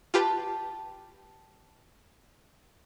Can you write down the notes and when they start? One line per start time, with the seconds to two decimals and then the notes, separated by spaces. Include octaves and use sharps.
0.14 F4 G4 B4 G5 A5